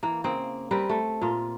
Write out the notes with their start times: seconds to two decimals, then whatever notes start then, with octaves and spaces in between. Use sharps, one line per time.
0.03 E3 A#3
0.24 C#3 A#3 C4
0.71 G3 C4 A#4 B4
0.89 A3
1.22 A#2 F4